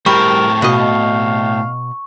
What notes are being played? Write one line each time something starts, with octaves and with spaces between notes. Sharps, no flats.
A2 G3 C4 A#4 C#6
B2 D#5 F5